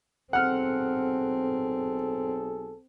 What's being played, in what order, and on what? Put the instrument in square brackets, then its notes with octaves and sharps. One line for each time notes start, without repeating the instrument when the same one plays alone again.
[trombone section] B1 G#4 A4 [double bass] C4 [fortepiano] F#5 F6